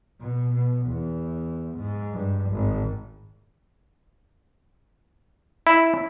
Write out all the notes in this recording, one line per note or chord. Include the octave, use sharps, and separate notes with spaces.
B2
B2
E2
G#2
G2
G#1
E4